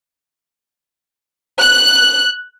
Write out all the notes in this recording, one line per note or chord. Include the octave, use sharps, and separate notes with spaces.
F#6